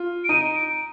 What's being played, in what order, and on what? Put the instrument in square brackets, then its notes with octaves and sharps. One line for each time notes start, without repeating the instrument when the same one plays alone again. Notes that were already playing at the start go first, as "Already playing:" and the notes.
Already playing: [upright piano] F4
[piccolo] D7
[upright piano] D#4 [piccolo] D#7
[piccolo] D7